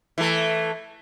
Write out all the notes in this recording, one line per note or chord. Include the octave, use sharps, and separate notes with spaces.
E3 A3